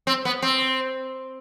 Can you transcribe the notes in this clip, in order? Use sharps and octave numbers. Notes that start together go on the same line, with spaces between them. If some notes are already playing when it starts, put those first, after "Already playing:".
C4
B3
C4